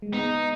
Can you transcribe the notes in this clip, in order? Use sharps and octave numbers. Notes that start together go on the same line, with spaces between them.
G#3
B3 D#4